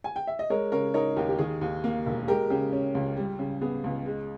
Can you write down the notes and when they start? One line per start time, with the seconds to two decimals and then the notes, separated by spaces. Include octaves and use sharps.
0.04 G#5
0.16 G5
0.27 E5
0.39 D#5
0.50 G#3 A#4 C#5
0.72 C#3 A#4 C#5
0.94 D#4 A#4 C#5
1.16 D#2 G4 A#4
1.29 G4
1.39 D#3 G#4
1.61 D#2
1.84 A#3
2.06 E1
2.28 G#3 G4 A#4
2.50 C#3 G4
2.72 C#4
2.95 C#2
3.17 G3
3.39 C#3
3.61 B3 G#4
3.84 C#2
4.06 G#3